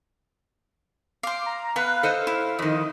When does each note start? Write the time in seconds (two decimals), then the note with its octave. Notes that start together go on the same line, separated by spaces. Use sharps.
1.23 C5 F5 D6
1.46 A#5
1.76 B3 B4 F5
2.03 A4 C5 D#5
2.27 E4 F5
2.59 F2 D#3 D#5